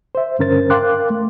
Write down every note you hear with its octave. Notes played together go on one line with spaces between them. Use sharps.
C5 E5
G2 D3 C#4 A#4 C5 A6
A#4 F5 G5 C6 D6 F#6
A3